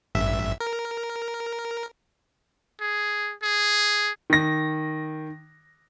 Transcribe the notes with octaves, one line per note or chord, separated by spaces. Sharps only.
A1 G2 E5
A#4
G#4
G#4
D#3 A#6